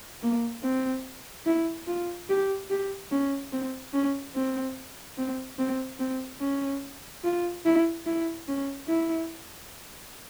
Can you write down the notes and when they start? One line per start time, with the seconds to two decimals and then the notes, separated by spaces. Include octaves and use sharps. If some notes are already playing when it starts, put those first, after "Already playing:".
0.22 A#3
0.63 C4
1.46 E4
1.87 F4
2.29 G4
2.70 G4
3.11 C#4
3.52 C4
3.93 C#4
4.35 C4
5.18 C4
5.59 C4
5.99 C4
6.40 C#4
7.24 F4
7.65 E4
8.06 E4
8.48 C#4
8.88 E4